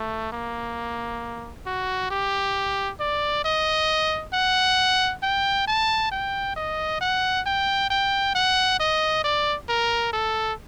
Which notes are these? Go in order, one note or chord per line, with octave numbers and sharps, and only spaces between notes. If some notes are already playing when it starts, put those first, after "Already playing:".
Already playing: A3
A#3
F#4
G4
D5
D#5
F#5
G5
A5
G5
D#5
F#5
G5
G5
F#5
D#5
D5
A#4
A4